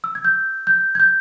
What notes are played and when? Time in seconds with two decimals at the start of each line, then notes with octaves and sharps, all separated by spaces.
0.04 E6
0.15 G#6
0.25 G6
0.67 G6
0.95 G#6
1.00 G6